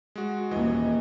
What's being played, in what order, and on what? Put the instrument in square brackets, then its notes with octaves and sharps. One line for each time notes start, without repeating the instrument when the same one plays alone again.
[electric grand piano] G#3 F#4
[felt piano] D#1 D#5 [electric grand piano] E3